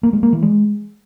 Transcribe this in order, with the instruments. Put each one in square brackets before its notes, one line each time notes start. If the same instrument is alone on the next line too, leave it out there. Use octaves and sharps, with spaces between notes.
[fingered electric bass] A#3
G#3
A#3
E3
G#3